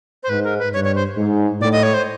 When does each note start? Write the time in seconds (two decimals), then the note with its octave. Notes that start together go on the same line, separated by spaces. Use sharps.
0.23 C5
0.29 G#2 B4
0.44 A#4
0.58 B4
0.73 G2 C#5
0.84 C#5
0.95 C5
1.18 G#2
1.61 A2 D5
1.72 D#5
1.83 C#5
1.94 C5